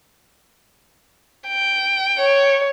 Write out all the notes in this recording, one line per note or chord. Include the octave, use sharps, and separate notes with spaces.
G5
C#5